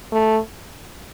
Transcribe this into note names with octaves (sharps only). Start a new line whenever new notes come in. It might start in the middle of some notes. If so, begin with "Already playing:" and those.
A3